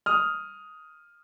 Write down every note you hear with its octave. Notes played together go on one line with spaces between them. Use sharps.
D#6 F6